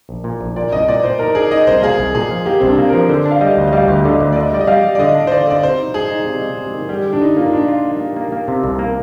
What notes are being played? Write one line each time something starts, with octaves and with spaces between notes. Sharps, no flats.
A#1
A#2
A#1
A#2 D5
C2 D#5
A#2 D5
A#2 C5
D#4 A#4
D#4 G#4
D#4 D#5
C2 C5
A#3 G#4
C2
A#2 G#4
F3
A#3 G4
C2 C4
D4
A#3
F3 A#4
D3 C5
D4
F5
G3 D#5
D2
D#5
G3 F5
D2
D3 D#5
D2
D5
D3 D#5
G3 D5
D#5
G3 F5
G3
D5
D3 D#5
D4
C5
D3 D5
D3 D5
C3 C5
D#4
G#3 G#4
D#4
C3
G#3
C3
D#3
G3 G4
D3
D4
D3 D#4
A#3 F4
D#4
D4 F4
F4
A#3
A#3
A#3
A#3
C3
C2
A#3